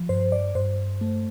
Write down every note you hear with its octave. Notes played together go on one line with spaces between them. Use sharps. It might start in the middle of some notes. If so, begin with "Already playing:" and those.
Already playing: F3
G2 C5
D5
G2 C5
A3